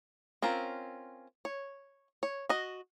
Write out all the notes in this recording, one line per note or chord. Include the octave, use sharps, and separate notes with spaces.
C4 C#4 F4 A#4
C#5
C#5
F#4 D#5